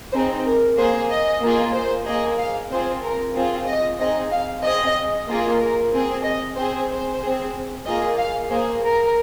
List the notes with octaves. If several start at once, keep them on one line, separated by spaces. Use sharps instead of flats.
C4 D#4 G#4 C5
A#4
A#3 G#4 C5
D#5
A#3 F4 G#4
C5
A#3 G#4 D#5
F5
C4 F4 G#4 C5
A#4
C4 F4 G#4
D#5
C4 D#4 G#4 D#5
F5
C4 G#4 D#5
A#3 F4 G#4
A#4
C4 G#4
D#5
C4 G#4 C5
C5
C4 G#4
A#3 F4 G#4 D#5
F5
A#3 G#4 C5
A#4